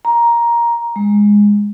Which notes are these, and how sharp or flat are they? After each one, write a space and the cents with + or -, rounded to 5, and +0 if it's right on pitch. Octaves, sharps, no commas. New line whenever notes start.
A#5 +10
G#3 -10